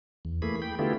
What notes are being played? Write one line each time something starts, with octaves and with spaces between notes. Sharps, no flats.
E2
E3 A3 A#3 G#4 B5
G5 B5
D3 A3 B3 E4 F4 G4